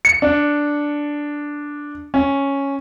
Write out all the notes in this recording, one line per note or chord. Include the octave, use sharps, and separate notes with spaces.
C#7
D4
C#4